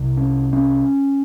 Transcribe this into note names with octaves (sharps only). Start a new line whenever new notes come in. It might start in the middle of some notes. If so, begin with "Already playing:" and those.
Already playing: C2 C3
C#4
C#4